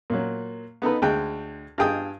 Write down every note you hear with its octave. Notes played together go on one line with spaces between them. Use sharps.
A#2 F#3
B3 D#4 A4 B4
D2 G#3 G5 F#6
G2 F4 G#4 G5 D#6